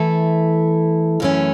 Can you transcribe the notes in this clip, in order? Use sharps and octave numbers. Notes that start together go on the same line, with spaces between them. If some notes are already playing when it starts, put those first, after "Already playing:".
Already playing: E3 A3 E4 A4
F#2 E3 A3 C#4